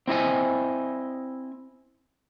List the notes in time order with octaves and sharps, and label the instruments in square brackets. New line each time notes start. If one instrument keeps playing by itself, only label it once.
[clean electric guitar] C4 E4 D#5 G#5